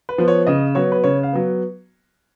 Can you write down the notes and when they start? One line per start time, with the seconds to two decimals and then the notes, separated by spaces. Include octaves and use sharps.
0.09 B4
0.18 F3 B3
0.28 C#5
0.47 C#3 D#5
0.75 F#3 B3 C#5
0.92 B4
1.04 C#3 C#5
1.23 F5
1.33 F#3 B3